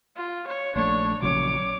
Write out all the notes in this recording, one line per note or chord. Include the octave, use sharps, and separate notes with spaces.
F4
C#5
A#1 A3 D4 C#5
A#1 C#3 F#3 C#5 D6